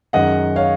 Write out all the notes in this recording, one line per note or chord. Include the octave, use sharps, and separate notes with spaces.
F#2 D#3 G#3 D#5 F#5
C#5 F5